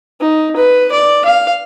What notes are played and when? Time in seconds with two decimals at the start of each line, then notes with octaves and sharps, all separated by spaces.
0.21 D#4
0.56 B4
0.92 D5
1.25 F5